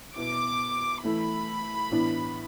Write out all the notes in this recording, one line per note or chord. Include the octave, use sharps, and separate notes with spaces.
B2 B3 E4 D6
E3 A3 E4 B5
A2 E3 B3 D4